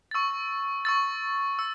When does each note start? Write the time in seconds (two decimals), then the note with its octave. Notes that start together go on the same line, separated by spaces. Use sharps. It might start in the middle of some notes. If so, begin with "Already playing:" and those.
0.11 C#6 E6 A6
0.85 C#6 E6 A6
1.59 E6